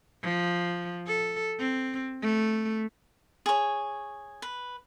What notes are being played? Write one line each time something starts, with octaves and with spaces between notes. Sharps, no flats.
F3
A4
C4
A3
G#4 C#5
B4